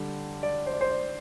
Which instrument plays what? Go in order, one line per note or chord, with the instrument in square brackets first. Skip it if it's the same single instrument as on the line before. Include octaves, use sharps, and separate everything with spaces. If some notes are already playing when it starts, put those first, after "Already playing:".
Already playing: [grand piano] D3 G3
D5
C5
D5
C5
D5